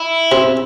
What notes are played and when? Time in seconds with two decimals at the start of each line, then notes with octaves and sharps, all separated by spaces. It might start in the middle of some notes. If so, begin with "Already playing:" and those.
Already playing: E4
0.32 C3